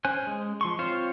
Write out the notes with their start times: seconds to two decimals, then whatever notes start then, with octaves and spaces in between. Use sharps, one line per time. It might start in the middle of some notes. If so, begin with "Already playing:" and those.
0.05 C#4 C5 G#5 F#6
0.27 G#3
0.61 F3 C6 C#6
0.79 C4 F4 C5 C#5 F5